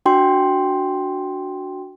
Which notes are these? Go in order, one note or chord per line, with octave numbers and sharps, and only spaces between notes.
D4 F#4 G5 C6